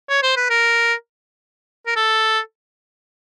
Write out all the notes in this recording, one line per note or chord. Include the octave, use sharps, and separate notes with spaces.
C#5
C5
B4
A#4
A#4
A4